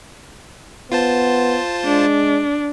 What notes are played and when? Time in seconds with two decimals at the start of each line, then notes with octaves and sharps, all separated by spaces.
0.91 B3 F4 C5 A5
1.85 G#3 D4